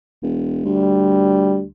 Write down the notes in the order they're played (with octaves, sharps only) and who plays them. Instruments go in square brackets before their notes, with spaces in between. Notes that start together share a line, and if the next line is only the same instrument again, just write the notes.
[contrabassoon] E1
[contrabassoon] D2 [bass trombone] G3